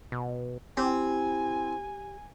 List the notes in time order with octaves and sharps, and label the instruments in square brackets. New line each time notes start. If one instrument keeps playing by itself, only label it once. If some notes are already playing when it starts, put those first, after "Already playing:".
[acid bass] B2
[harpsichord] C4 [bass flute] E4 [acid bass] G4 [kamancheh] G#5